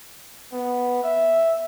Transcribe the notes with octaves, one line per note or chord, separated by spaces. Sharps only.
B3
E5